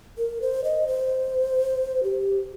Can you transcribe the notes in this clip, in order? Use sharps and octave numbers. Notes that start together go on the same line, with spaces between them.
A#4
C5
D#5
C5
G4